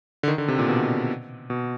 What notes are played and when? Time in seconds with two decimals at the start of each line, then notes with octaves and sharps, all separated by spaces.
0.23 D3
0.28 D#3
0.38 D3
0.48 C3
0.59 A#2
0.69 B2
1.50 B2